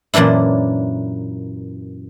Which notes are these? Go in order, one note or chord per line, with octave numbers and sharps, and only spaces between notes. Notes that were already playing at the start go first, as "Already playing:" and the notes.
F#2 A#2 E3 D4 E4